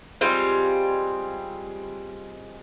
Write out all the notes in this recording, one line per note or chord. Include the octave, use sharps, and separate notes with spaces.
G3 G#3 C4 F4